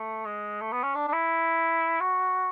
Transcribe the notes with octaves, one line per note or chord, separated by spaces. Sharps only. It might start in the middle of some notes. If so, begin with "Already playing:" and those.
Already playing: A3
G#3
A3
B3
C#4
D4
D4
E4
F#4